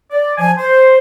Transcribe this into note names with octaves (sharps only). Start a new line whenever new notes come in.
D5
F3 G#5
C5